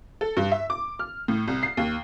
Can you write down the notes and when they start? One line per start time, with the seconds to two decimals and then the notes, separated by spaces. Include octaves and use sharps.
0.21 A4
0.37 G2
0.52 E5
0.70 D6
0.99 F6
1.28 A2
1.48 C2
1.63 C7
1.77 D#2